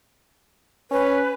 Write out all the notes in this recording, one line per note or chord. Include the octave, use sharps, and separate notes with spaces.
C#4 B4